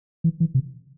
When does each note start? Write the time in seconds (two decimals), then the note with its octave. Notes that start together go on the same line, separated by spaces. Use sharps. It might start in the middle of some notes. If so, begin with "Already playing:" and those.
0.24 E3
0.40 E3
0.54 C3